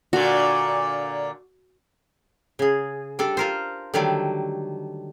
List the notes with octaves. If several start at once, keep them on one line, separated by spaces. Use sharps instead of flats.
A#2 D3 F#4
C#3 G#4
G3 D4 A4
F4 A#4 C5
D3 D#3 F#3 G3 A3